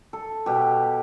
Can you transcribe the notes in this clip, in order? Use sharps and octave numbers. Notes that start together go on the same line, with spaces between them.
A4
B2 G4